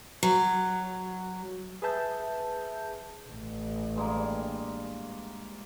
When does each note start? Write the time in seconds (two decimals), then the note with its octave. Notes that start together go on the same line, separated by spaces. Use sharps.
0.23 F#3
1.82 G#4 B4 E5 A5 G6
3.29 A1
3.96 G2 G#3 A#3